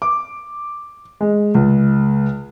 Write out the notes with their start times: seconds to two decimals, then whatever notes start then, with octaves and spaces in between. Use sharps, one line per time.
0.02 D6
1.21 G#3
1.55 C#2